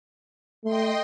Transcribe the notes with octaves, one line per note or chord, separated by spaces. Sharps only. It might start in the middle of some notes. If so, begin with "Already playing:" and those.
A3 D#5 G5 C6